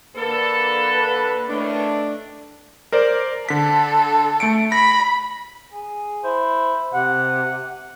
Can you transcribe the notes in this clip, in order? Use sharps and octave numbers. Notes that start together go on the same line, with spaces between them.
D3 A#3 A4 B4
A2 D#3 A3 D4
A#4 C5 D5
D3 A4 B6
A3 C#7 D7
B5 A#6
G#4
E4 C5
C3 F#5